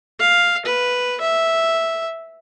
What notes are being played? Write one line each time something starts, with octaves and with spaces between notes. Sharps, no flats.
F5
B4
E5